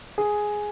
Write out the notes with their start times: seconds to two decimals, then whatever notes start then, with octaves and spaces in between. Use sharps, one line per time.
0.18 G#4